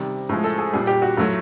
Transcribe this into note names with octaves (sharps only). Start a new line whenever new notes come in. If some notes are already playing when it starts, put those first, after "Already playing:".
Already playing: C3 D#3 G3
A2 F3 G#3
A4
G#4
A#2 G3 G#4
G4
F#4
A2 F#3 A3 F4